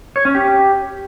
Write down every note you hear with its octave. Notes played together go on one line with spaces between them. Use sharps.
C#5
C#4
G4